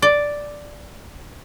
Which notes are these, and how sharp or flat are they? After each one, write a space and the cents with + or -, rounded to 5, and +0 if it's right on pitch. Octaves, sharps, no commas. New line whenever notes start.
D5 +0